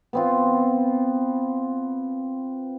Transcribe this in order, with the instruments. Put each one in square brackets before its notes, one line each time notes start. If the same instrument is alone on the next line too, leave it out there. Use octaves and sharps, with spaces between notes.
[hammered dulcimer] B3 C4 F4